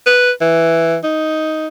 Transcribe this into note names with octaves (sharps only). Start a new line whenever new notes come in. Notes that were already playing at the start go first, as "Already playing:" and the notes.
B4
E3
D#4